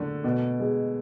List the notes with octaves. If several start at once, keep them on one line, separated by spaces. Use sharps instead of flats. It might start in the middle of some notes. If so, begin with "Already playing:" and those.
Already playing: D3 A3
B2
G#3